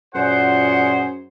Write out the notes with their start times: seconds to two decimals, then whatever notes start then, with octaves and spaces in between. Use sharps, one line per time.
0.15 F#2 A#2 F4 G#4 C5 F#5